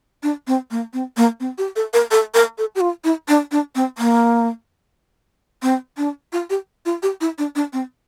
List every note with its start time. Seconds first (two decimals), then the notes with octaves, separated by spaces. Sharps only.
0.23 D4
0.47 C4
0.71 A#3
0.93 C4
1.17 A#3
1.40 C4
1.58 G4
1.76 A4
1.93 A#4
2.11 A4
2.34 A#4
2.58 A4
2.75 G4
2.81 F4
3.04 E4
3.28 D4
3.52 D4
3.75 C4
3.98 A#3
5.63 C4
5.97 D4
6.33 F4
6.50 G4
6.86 F4
7.03 G4
7.21 E4
7.38 D4
7.56 D4
7.73 C4